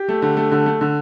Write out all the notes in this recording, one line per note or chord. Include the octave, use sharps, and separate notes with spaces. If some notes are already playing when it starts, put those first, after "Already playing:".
Already playing: G4
A3
D3
A3
D3
A3
D3